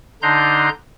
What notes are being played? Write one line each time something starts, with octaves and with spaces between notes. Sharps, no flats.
D3 D4 D#4 A#5 C6 G6